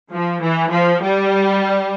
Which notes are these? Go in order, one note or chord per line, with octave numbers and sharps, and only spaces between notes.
F3
E3
F3
G3